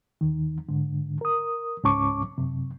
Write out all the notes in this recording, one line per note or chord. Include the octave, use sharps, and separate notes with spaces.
D#2 D#3
G#2 D3
A#4 D#6
C#2 G#2 C#4 A5 C#6 D6
F#2 C3